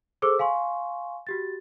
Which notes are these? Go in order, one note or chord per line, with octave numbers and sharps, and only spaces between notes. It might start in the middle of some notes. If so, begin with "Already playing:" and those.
G#4 A4 C5 D6 E6
F5 G#5 C6 C#6
F#4 G4 A6